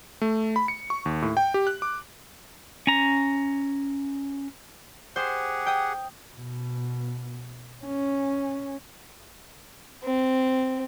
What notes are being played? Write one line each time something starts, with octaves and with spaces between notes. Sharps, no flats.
A3
B5
C#7
C#6
D#2
A2
G5
G4
F#6
D6
C#4 A#5
G4 G#4 C5 F#5
G5 D#6
B2
C#4
C4